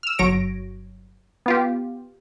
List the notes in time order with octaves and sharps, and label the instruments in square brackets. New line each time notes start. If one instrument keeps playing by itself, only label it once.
[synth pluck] E6 F6
G1 F#3 C#5 A#6 D7
B3 F4 G4